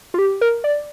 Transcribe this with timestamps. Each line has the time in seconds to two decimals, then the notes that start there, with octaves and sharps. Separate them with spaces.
0.14 F4
0.19 G4
0.41 A#4
0.64 D5